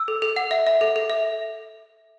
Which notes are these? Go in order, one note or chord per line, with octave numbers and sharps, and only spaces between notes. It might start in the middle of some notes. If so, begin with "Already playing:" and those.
Already playing: E6
A4
A4
F#5
E5
E5
A4
A4
E5